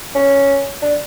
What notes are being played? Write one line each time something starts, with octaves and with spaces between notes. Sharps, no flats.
C#4
D4